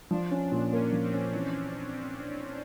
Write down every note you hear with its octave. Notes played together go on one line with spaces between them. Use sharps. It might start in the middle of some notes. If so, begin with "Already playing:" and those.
F3 D4
C#4
A#2
A#3 C#4
F3
C4
C#4
E3